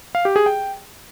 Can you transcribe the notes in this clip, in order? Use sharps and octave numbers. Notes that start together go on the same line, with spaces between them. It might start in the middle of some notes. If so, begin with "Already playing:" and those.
F5
G4
G#4
G5